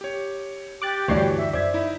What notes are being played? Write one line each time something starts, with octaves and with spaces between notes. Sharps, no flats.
G4 C#5
G4 D6 F#6 A6
D2 G2 E3 F#4 C#5 D5 C7
E5
F#2 C5 D5 E5 G#6
D#4 E4